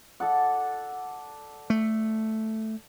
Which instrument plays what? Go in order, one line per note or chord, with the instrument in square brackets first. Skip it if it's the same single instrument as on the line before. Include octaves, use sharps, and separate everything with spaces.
[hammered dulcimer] A4 D5 F#5
[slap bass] A3